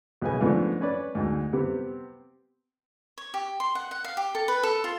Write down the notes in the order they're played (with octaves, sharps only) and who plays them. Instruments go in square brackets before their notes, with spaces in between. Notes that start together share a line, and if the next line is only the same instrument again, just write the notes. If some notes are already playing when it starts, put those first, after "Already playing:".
[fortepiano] B1 C#3 B4 G#5
G#2 F3 A3 B3 D4
C#4 B4 D5
D2 G#2
C3 B3 C4 G4
[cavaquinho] C#5
G4
C6
F#5
F#5
F5
G4
A4
B4
A4
F4